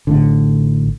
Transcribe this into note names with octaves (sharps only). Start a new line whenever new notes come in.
A1 A2 D3